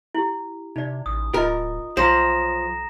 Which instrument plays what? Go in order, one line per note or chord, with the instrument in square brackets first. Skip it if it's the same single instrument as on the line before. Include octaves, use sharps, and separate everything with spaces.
[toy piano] E4 G4
[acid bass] C3 [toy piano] D#4 D5
[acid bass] A1 [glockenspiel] D#6
[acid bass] D1 [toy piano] F4 D#5 [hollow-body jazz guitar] A#4
[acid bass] B1 [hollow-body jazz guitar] F3 [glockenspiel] A#5 A#6 E7